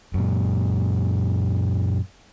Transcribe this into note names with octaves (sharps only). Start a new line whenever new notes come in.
F#2 A#2